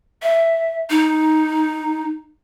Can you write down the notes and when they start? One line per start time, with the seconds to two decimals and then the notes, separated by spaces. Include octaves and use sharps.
0.23 E5
0.90 D#4